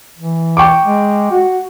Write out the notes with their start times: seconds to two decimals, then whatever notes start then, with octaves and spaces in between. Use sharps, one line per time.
0.18 E3
0.57 G5 C#6 D6
0.84 G#3
1.31 F#4